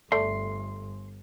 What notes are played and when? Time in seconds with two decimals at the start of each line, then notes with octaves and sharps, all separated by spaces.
0.12 G1 A3 D5 C6